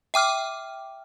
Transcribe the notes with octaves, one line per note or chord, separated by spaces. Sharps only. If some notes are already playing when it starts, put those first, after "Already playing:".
E5 G5 D6 F6